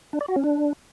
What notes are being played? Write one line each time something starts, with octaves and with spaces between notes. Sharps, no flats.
D4
D5
F#4
C#4
D4